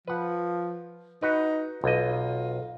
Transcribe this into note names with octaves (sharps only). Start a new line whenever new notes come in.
F3 B4 F#5
D#4 F#4 B4
B1 F4 D#5